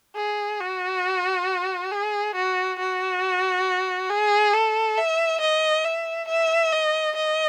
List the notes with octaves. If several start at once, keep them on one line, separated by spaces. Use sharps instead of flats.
G#4
F#4
G#4
F#4
F#4
G#4
A4
E5
D#5
E5
E5
D#5
D#5